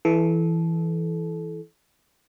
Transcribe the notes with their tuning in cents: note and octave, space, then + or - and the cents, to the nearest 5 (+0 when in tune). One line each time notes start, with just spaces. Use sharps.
E3 +0 A4 -25